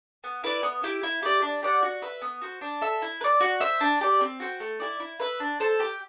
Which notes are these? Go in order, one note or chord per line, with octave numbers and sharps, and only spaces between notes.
B3
E4 B4 D5
B3
E4 G4
E4
G4 D5
D4
G4 D5 F#5
F#4
B4 E5
B3
F#4 C5
D4
A4 E5
E4
B4
D5
F#4
C5 E5
D4
G4 D5
C4
F#4 C5 G5
A3
E4 G4 D5
E4
B4 E5
D4
A4 C5
G4